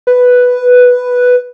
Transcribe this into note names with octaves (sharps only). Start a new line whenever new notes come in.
B4